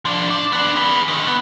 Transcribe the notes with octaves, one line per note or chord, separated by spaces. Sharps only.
F3 D4
D4
B3 D4
G#4 B4
D3 D#3
B3